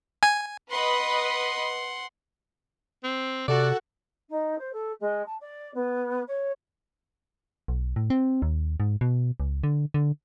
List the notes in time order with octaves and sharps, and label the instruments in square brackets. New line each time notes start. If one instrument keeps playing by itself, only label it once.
[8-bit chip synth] G#5
[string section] B4 D#5 [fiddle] F#5 C6
[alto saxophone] C4
[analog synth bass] C3 [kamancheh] F#4 F#5 [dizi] A4 [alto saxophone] D5
[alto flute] D#4
C5
A4
G#3
A5
D5
B3
C#5
[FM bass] B1
A2
C4
D#2
G#2
B2
C#2
D3
D3